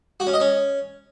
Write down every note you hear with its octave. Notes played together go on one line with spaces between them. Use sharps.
F#4
C#4
D#5
C#4